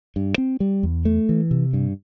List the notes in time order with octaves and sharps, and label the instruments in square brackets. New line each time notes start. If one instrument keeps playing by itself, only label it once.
[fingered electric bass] G2
C4
G3
E2
A3
E3
C3
G2